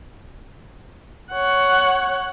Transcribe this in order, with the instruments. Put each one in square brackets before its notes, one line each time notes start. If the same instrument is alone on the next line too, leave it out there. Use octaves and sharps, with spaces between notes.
[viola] C#5 F#5